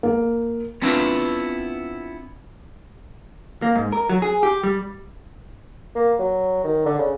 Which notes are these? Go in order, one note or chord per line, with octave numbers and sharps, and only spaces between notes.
A#3
B3 C4 D4 E4 F4 B4
A#3
G#2
A#4
F#3
G#4
G4
G3
A#3
F#3
D#3
D3
C#3